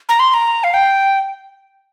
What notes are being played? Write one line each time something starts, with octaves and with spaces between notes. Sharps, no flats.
A#5
C6
C6
A#5
F5
G5